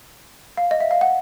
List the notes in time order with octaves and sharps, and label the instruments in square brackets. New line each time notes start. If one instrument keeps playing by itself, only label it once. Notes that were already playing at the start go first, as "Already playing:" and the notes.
[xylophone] F5
D#5
E5
F5
F#5